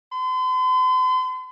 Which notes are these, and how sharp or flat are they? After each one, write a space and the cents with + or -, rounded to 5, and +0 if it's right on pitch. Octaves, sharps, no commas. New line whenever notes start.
C6 -45